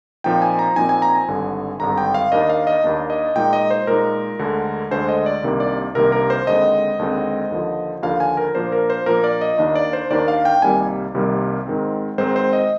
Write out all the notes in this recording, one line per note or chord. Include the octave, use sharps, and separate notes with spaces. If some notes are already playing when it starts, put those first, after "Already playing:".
A#2 F3 C4 D#4 G5
G#5
A#5
A#2 F3 C4 D#4 G#5
G#5
A#5
G#5
G#1 G2 D3
G#1 G2 D3 A#5
G5
F5
D#2 D#3 A#3 D4 D#5
F5
D#5
D#2 D#3 A#3 D4
D#5
A#2 G#3 D#4 G5
D#5
C5
A#2 G#3 D#4 A#4
D2 D3 G#3
D2 D3 G#3 C5
D#5
D5
C2 C3 D#3 A#3 D4
D5
C2 C3 D#3 A#3 D4 A#4
A#4
C5
D#2 D3 G#3 C4 D#5
D#2 D3 G#3 C4
D#2 D3 F3
D#2 D3 F3 F5
G#5
A#4
A#2 F3 A#3 D4 C5
A#4
C5
A#2 F3 A#3 D4 A#4
D5
D#5
D#2 D#3 A#3 D4 D#5
D5
C5
D#2 D#3 A#3 D4 D5
F5
G5
C2 C3 D#3 G3 A#3 G#5
C2 C3 D#3 G3 A#3
G#2 D#3 G#3 C4
G#2 D#3 G#3 C4 C5
C5
D#5